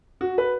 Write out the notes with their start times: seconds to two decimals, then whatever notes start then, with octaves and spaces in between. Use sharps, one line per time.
0.21 F#4
0.38 B4